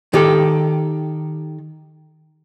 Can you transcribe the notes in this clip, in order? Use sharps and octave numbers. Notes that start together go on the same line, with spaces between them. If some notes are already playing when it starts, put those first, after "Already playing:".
D#3 G4 A4